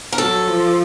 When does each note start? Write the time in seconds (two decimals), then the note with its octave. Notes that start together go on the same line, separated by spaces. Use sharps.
0.12 A#4
0.18 F#3 A4
0.48 F3